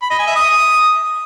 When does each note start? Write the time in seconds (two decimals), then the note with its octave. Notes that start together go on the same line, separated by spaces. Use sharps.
0.02 B5
0.11 D#5
0.19 G#5
0.27 E5
0.36 D#6